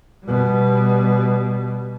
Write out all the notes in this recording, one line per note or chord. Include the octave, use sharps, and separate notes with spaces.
B2 G3